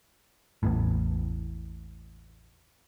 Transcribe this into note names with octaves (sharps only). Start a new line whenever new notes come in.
A1 E2 A2